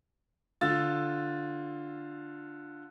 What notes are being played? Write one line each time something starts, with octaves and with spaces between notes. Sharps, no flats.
D3 F4 E6 A6